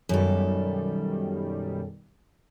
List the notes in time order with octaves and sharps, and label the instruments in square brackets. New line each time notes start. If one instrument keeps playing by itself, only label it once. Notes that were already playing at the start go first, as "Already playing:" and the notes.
[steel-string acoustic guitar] F#2 A4 [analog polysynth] B2 D#3 G3